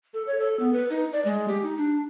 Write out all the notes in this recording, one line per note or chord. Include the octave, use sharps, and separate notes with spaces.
A4
C#5
A4
B3
B4
D#4
D5
G#3
G4
D#4
D4